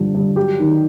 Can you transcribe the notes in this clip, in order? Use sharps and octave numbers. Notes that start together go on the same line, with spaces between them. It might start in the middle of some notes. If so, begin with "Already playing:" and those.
Already playing: G2 D3 F3
G2
F#3 G4
D#3